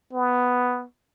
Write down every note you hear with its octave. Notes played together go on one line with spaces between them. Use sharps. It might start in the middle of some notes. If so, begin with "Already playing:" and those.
B3